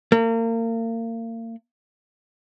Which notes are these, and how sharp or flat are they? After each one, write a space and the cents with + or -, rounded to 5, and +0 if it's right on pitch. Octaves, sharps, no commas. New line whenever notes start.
A#3 -35